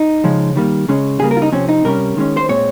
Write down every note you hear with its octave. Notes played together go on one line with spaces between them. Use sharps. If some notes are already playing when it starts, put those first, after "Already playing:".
Already playing: D#4
C#3 F3 G#3
D#3 G3 A#3
C#3 G#3 C#4
C#3 G3 A#3 G#4
A#4
F4
D#4
C3 F3 C4 C#4
D#4
C3 G3 C#4 A#4
D#3 G#3 C#4
C5
A#2 G#3 C4 C#5